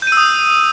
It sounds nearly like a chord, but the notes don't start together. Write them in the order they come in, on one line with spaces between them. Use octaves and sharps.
G6 D#7 E6 D#6